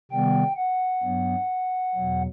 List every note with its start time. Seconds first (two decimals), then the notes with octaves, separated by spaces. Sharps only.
0.11 C3 D#3 G3 B3 G5
0.57 F#5
1.03 G2 F#3 B3
1.95 E2 B2 F#3